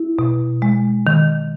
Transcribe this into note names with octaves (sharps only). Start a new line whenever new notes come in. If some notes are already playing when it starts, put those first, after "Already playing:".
Already playing: E4
B2
G#3
D#3